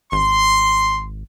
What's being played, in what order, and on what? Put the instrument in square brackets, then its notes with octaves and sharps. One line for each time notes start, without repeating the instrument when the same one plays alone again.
[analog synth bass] G#1 [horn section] C6